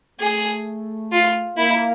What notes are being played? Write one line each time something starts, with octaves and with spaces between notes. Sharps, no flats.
A3 G#4
F4
A#3 E4